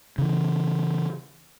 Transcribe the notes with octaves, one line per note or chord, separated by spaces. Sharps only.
C#3 E3